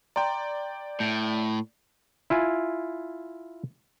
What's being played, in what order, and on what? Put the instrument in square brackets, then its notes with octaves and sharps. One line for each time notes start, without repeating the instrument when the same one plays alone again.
[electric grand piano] D5 G5 [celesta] A#5 C6
[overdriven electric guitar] A2 [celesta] G6 D7
[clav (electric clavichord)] E4 F4 G#5